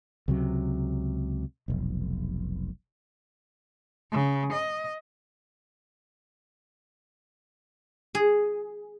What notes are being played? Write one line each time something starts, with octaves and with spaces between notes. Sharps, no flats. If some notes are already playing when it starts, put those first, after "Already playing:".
C#2 C3 F#3
F1 B1
C#3
D#5
G#4